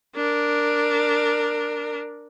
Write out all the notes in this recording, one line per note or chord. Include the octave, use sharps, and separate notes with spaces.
D4 A#4